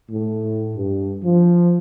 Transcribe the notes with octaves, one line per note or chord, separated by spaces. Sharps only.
A2
G2
F3